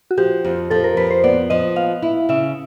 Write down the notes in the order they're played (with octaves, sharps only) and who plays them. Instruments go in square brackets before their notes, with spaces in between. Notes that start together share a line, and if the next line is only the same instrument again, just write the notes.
[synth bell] F#4
[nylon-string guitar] F3 [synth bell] G4
[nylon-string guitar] F2
[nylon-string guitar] F3 [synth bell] A4
[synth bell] A#4
[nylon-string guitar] F2 [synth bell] B4
[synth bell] C5
[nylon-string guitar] B3 [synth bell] D5
[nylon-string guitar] F3 [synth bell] D#5
[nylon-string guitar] B3 [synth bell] F5
[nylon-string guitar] E4
[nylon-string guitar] C#3 [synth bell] E5